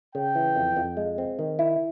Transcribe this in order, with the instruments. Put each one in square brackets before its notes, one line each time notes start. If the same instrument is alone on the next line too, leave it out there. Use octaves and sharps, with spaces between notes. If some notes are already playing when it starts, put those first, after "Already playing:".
[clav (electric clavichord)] C#3 [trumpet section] G5
[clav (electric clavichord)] E3
F2
F2
G#3
C4
D#3
E4